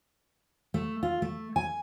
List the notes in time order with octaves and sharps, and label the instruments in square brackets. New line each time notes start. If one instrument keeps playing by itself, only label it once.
[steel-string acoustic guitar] A3
F4
A3
G#5